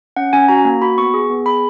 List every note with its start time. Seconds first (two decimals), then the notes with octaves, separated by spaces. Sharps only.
0.17 C#4 F#5
0.33 C#4 G#5
0.48 F#4 A#5
0.65 A#3
0.82 F#4 B5
0.98 B3 C#6
1.14 G#4
1.30 B3
1.46 G#4 B5